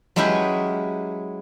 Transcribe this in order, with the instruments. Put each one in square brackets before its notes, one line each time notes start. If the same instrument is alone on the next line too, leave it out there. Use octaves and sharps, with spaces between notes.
[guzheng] F#3 G#3 C#4 E4 G4 B4